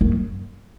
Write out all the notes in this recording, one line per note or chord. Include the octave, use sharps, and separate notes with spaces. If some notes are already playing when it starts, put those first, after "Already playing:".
F#2